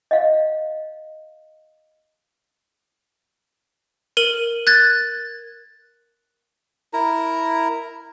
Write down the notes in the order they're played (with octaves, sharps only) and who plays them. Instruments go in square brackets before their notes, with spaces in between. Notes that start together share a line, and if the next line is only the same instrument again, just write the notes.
[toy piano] D#5 F5
[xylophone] A#4 D#7 F#7
F#6 G#6 A6
[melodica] E4 A#4 A#5